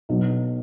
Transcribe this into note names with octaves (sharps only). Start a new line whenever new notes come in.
B1 B2 F#3